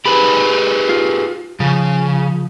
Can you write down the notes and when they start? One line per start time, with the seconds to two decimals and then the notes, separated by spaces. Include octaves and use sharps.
0.06 G4 G#4 B4 B5
0.89 F4
1.60 C#3 F3